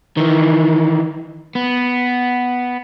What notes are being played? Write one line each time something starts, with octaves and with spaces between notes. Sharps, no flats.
D#3 E3
B3